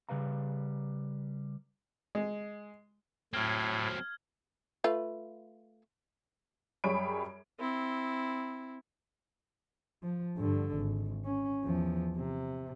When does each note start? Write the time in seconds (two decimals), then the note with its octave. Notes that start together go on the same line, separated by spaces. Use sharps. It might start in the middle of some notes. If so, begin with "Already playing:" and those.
0.09 C#3 G3 B4 F5 A#5
2.15 G#3
3.34 A2 F#3 C4 F6 G#6
4.84 A3 F4 B4
6.84 F#2 G3 G#4 C#5 B5 D7
7.60 C4 E4
10.03 F3
10.37 G2 D3
10.76 G#1
11.25 C#4
11.65 E2 F3
12.16 C3